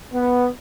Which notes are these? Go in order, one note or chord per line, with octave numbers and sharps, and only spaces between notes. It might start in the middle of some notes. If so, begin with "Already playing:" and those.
B3